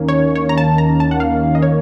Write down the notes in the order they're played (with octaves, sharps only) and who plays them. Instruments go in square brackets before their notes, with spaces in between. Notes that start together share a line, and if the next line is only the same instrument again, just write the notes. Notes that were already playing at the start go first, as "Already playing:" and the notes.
Already playing: [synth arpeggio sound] D#2 D#3 A#3 C#4
C#5
C#5
A#5
A5
A#5
A5
F#5
F5
D#5
C#5